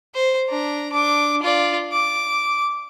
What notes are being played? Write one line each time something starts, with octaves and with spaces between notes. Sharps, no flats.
C5
D4 A#5
D4 D6
F4 D5
D6